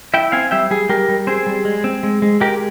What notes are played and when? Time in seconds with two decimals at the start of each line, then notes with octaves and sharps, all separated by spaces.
0.14 E4 E5 G5
0.32 C4 F5 G#5
0.51 G3 E5 G5
0.71 G3 G#4
0.89 G3 G4 A#4
1.09 G3
1.27 C4 G#4 C5
1.46 G3
1.65 G#3
1.84 C4
2.03 G#3
2.22 G#3
2.41 G#3 G4 A#4